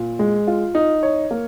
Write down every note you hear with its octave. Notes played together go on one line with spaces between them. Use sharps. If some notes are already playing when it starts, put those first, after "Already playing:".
Already playing: A#2
G#3
F4
D#4
C#5
A#3